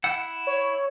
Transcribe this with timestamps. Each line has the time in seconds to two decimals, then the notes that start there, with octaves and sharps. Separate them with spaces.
0.04 E4 F#5
0.47 C#5